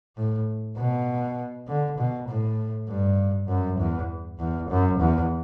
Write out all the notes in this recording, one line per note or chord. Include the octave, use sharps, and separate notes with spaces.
A2
B2
D3
B2
A2
G2
F#2
E2
E2
F#2
E2